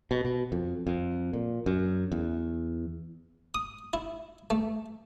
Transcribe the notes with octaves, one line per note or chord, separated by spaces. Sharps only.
B2
B2
F2
F2
A#2
F#2
E2
D#6
E4
A3